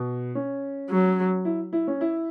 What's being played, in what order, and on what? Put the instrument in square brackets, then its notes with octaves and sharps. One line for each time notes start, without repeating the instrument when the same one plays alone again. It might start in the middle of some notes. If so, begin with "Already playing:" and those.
Already playing: [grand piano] B2
C#4
[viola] F#3
[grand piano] E4
E4
C#4
E4